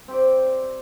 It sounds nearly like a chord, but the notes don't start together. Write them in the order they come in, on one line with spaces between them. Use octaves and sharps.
C4 G4 D5